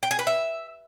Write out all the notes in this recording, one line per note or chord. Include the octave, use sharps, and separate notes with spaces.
G5
G#4
B4
E5